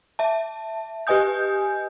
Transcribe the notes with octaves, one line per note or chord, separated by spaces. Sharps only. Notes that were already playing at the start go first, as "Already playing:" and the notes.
E5 A5
G4 B4 D#5 G#5 D#6 G6